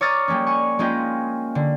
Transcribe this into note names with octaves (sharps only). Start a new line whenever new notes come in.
C#5 A#5 D6 D#6 F6 A6
G3 G#3 A#3 C#4
G#5 C#6
G#3 A#3 C#4 F4 D#5 G5
D3